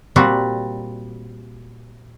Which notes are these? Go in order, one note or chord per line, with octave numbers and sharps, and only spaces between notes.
A#2 G3 C4 F#4 A#5